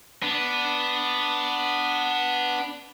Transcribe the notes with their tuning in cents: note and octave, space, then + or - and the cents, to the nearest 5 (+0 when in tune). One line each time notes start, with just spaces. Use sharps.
B3 +0 D4 +0